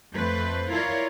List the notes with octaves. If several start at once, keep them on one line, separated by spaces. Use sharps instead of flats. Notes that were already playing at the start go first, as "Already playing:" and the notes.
F2 A3 B4 C5
E4 F4 A#4 C#5 D5